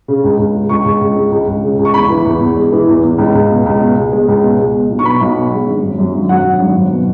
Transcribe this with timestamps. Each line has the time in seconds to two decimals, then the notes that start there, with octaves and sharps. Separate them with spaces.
0.08 C#3
0.24 C#2
0.39 C#2
0.54 G#3
0.69 C#2 C#6
0.85 C#2
1.01 C#2
1.16 G#3
1.32 C#2
1.47 C#2
1.63 C#3
1.79 C#2
1.85 C#6
1.94 E2 B5
2.10 E3
2.25 E2
2.40 E2
2.57 G#3
2.72 E3
2.88 E2
3.03 E2
3.18 C#2
3.34 C#2
3.49 B2
3.66 C#2
3.81 B2
3.96 G#3
4.12 G#3
4.28 C#2
4.43 B2
4.59 G#3
4.74 B2
4.90 B1
4.99 C#6
5.05 B2 B5
5.21 B1
5.36 B2
5.52 G#3
5.67 G#1
5.82 F#2
5.98 F#2
6.14 G#1
6.29 F#3 F#5
6.45 F#3
6.60 G#1
6.76 F#2
6.91 B2